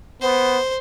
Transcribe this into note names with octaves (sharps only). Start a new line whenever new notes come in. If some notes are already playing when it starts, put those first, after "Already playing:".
B3 C5